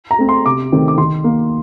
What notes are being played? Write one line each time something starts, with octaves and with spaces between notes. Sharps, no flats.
A#5
A3 C4
C6
C3 D6
D#3 A3 C4
D6
D#3 C6
A#3